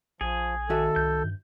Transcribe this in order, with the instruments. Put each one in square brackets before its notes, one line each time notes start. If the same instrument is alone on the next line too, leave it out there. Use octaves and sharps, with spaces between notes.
[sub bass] A#1 [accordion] F3 [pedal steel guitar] G#4
[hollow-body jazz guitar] D#3 F#4 E5 [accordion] A4
[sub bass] C2 [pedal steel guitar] G6
[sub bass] G2